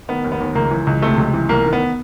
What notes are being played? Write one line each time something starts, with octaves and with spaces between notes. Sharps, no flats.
D#3 B3
D#2
B3
D#2
C#2 A#3
E3
C#2
C3 A3
C#2
E3
C2 A#3
D#3
B3